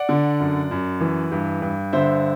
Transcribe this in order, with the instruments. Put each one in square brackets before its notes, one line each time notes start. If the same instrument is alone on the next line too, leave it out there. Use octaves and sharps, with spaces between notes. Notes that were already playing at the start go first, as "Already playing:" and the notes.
Already playing: [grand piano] D5 F#5
D3
F#2
F#2
E3
G2
G2
D3 C5 E5